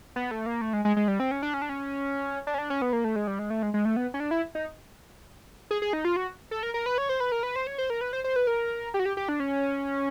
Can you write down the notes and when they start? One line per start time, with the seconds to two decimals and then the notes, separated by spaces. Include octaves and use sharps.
0.16 B3
0.31 A3
0.46 A#3
0.61 A3
0.73 G#3
0.85 G#3
0.97 G#3
1.08 G3
1.20 C4
1.31 C#4
1.42 D4
1.54 C#4
1.62 D4
1.69 C#4
2.47 D4
2.54 C#4
2.58 D4
2.70 C#4
2.82 B3
2.93 A#3
3.04 A3
3.16 G#3
3.27 G3
3.39 G#3
3.50 A3
3.63 G#3
3.74 G#3
3.85 A3
3.96 B3
4.14 C#4
4.20 D4
4.31 E4
4.55 D#4
5.71 G#4
5.82 G#4
5.93 D#4
6.05 F4
6.16 F#4
6.51 A4
6.63 A#4
6.74 A#4
6.86 B4
6.98 C#5
7.09 C5
7.20 B4
7.32 A#4
7.43 B4
7.56 C5
7.67 C#5
7.78 C5
7.90 A#4
8.01 B4
8.13 C5
8.24 C5
8.36 B4
8.47 A#4
8.94 G4
8.99 F#4
9.05 G4
9.17 G4
9.29 D4
9.40 C#4